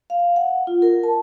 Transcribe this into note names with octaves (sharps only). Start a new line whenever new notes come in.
F5
F#5
F4
A#4
A5